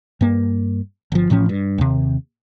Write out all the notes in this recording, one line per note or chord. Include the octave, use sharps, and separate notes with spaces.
G2 A#3
G1 F3
A1 A2 F3 C#4
G2
D#2 C3